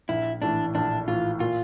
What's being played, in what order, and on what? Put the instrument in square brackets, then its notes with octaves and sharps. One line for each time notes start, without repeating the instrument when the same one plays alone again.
[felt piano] A#1 [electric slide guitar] E4
[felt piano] A2 E3 [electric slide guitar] D4
[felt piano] A#1 [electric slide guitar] D4
[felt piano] A2 E3 [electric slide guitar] F4
[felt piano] A#2 [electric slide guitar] F4